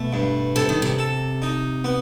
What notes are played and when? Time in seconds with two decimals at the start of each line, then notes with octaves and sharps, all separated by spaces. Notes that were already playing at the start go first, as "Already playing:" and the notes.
Already playing: B2 A3
0.13 G2
0.56 C3 A4
0.69 D#3
0.82 C3
0.99 A4
1.42 D#4
1.84 B3